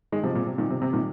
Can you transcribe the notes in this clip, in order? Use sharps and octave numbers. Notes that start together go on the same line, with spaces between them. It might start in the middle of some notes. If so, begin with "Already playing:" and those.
D#3 G#3
C3 F3
A#2
C3
A#2 D#3
C3
C3
A#2 D#3